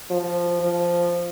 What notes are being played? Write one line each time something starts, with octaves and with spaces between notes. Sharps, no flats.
F3
F3